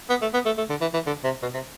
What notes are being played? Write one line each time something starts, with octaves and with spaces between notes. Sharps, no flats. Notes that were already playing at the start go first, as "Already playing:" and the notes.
B3
A3
B3
A3
A3
D3
E3
E3
D3
C3
B2
C3